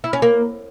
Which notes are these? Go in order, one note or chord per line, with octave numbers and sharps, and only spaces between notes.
E4
C#4
A#3